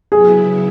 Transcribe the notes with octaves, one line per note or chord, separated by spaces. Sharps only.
C#3 F#3 B3 E4 G#4